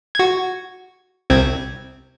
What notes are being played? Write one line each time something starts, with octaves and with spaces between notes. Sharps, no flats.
F#4 G#6
C2 C4 G#6